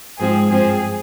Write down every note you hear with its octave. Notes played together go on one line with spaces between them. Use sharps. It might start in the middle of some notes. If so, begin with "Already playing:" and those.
G#2 F3 C4 G#4
G2 F3 C4 G#4